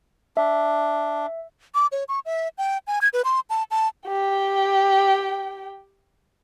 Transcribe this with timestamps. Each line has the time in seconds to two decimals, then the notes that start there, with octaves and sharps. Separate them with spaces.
0.37 D4 E5
1.75 D6
1.92 C#5
2.09 C#6
2.26 E5
2.58 G5
2.87 G#5
3.02 G#6
3.13 B4
3.25 C6
3.50 A5
3.71 A5
4.07 G4 G5